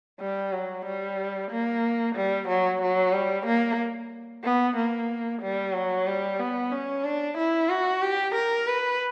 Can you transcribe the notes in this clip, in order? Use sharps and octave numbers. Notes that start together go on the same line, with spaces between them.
G3
F#3
G3
A#3
G3
F#3
F#3
G3
A#3
B3
A#3
G3
F#3
G3
B3
C#4
D4
E4
F#4
G4
A#4
B4